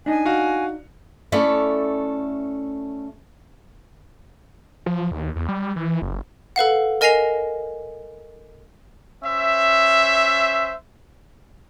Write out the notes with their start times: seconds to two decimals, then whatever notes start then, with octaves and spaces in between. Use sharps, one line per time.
0.06 D4 D#4 G#5
0.26 F#4 F5
1.32 A3 C#4 E4 A4 D5 E5
4.86 F3
5.11 D#2
5.36 E2
5.48 G3
5.76 E3
6.02 F#1
6.56 A4 B4 F5 F#5
7.01 A#4 D#5 G#5 A#6 C7 F7
9.23 C#4 C5 E5